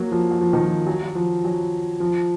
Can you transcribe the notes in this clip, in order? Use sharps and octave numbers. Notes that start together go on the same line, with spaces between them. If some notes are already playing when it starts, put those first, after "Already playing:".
Already playing: F#3 A#3
F3
F#3
F3
D#3
F3
F#3
F#3
F3
F#3
F3